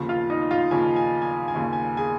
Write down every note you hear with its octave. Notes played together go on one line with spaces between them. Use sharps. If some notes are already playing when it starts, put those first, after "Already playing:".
Already playing: D#2 C#3 F3
F4 F5
D#4 D#5
F4 F5
D#2 C#3 F3 G#5
G#5
G#5
G#5
D#2 C#3 F3
G#5
G#4 G#5